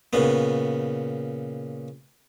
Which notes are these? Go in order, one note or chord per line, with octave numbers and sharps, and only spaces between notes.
A#2 C#3 B3